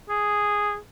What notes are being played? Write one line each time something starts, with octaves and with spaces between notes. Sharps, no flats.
G#4